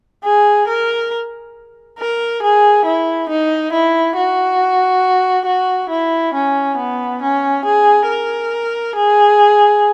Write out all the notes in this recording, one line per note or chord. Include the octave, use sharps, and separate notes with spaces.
G#4
A#4
A#4
G#4
E4
D#4
E4
F#4
F#4
E4
C#4
B3
C#4
G#4
A#4
G#4